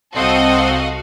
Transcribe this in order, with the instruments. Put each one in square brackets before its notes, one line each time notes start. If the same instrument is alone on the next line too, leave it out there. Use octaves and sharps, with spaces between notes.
[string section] C2 F#4 F5 [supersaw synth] C4 [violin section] A4 D#5